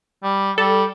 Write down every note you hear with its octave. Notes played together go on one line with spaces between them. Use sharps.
G3
G3 A4